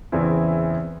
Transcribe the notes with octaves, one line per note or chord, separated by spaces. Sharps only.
E2 C#3 E3 C4 E4